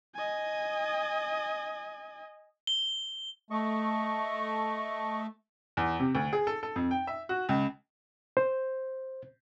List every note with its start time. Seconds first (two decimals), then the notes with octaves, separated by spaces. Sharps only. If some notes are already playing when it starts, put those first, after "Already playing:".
0.16 D#5 G#5
2.67 G7
3.51 A3 D#5 C#6
5.77 E2
6.00 C3
6.15 D2
6.33 G#4
6.47 A4
6.63 A4
6.76 F2
6.91 G5
7.07 E5
7.29 F#4
7.49 C#2
8.37 C5